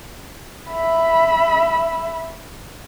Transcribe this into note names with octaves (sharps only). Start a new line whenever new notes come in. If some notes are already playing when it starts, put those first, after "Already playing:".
E5 B5